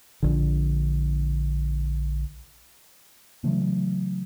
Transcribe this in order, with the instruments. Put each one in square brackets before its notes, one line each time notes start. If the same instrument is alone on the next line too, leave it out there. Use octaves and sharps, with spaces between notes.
[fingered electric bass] A#1 D3
C#3 E3 F#3 A3